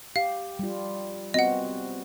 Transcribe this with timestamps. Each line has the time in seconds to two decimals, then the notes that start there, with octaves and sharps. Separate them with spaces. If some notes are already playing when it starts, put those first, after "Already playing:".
0.16 G4 F5
0.59 G3 F4
1.34 B3 C4 F#4 D#5 F#5